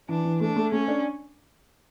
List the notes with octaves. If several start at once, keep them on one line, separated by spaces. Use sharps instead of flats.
E3 D4
E3
A3 D4
A3
A3 C#4
D4